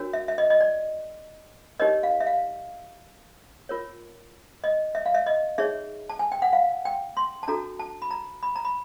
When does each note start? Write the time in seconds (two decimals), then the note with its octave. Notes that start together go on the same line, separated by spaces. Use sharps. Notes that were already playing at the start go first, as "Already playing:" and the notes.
Already playing: D4 F#4 A#4 C#5
0.13 E5
0.28 E5
0.38 D#5
0.50 D#5
0.61 D5
1.80 D#4 G4 A#4 C#5 D#5
2.03 F5
2.20 E5
2.27 F5
3.69 F4 A#4 C#5
4.64 D#5
4.95 E5
5.06 F5
5.14 E5
5.26 D#5
5.58 D#4 G#4 C#5 E5
6.09 A5
6.19 G#5
6.32 G5
6.42 F#5
6.53 F5
6.85 G5
7.17 C6
7.43 A5
7.48 D4 F#4 A4 A#5
7.79 A5
8.02 B5
8.11 A#5
8.43 B5
8.56 A#5
8.65 B5